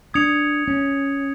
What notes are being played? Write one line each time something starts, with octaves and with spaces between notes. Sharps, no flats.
D4 D#6 G#6 C#7 F7
C#4